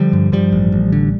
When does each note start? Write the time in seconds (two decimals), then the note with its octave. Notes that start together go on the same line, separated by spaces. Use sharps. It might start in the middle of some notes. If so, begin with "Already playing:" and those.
Already playing: D3 F3 G3
0.13 G2
0.32 G2 F3 G3
0.53 A1
0.72 A1
0.92 D3